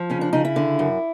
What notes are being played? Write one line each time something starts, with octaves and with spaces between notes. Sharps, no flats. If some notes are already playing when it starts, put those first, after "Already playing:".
Already playing: F3
C#3 C#4
D4
C#3 D#4
E4
D3
F#2